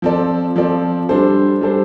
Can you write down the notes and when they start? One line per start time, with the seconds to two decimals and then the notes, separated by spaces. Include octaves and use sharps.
0.02 F3 C4 A4 D5
0.56 F3 C4 A4 D5
1.09 G3 D4 A4 C5
1.61 G3 D4 A4 C5